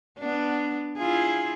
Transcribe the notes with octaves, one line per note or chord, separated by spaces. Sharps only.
B3 D4
E4 F4 G#4